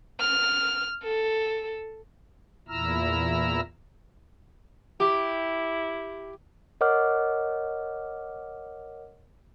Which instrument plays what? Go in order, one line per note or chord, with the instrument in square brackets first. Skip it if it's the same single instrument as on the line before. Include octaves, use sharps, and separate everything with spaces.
[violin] F6
A4
[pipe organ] E2 A#2 E4 A#5 E6 F6
[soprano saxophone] E4 [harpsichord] G4
[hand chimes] A#4 C#5 D#5 F#5 D6 F6